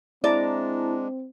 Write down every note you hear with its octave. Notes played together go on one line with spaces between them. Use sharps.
G#3 C4 D4 E4 D5 A5 A#5